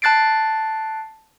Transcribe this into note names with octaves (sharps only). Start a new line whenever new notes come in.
A5 F#6 A6 C7 D7